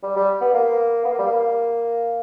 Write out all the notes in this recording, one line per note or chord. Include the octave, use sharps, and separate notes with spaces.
G3
G3
B3
A#3
B3
A#3
G3
A#3